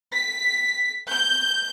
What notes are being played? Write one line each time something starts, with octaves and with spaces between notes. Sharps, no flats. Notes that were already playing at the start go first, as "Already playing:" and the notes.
B6
G6